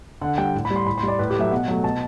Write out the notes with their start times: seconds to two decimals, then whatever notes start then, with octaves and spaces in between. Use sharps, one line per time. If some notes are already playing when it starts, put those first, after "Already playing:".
0.21 D3 F#5
0.38 G3 G5
0.55 A2
0.65 B5
0.71 G3
0.76 C6
0.87 A2 B5
0.98 C6
1.03 G3
1.08 D5
1.19 A2 B4
1.30 G4
1.36 F#3 A3 E5
1.51 B2 F#5
1.68 F#3 A3
1.84 B2 A5